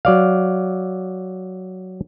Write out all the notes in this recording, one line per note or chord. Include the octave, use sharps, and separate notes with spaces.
F#3 D5 F5